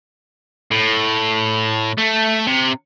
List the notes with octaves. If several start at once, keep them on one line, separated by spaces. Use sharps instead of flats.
A2
A3
C3